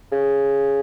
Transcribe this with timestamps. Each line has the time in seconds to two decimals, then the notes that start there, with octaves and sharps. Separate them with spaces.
0.12 C#3